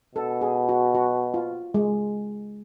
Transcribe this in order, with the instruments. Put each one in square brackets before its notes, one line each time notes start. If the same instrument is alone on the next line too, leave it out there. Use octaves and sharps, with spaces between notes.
[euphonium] B2 [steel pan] A4
[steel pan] G#4
F#4
F#4
F4
G#3